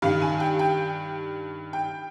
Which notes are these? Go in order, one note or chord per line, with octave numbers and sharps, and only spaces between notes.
G2 D#3 F5
G#5
G5
G5
G5